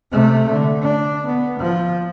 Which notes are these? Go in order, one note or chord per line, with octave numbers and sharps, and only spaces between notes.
C3 A3
D3
D4
B3
F3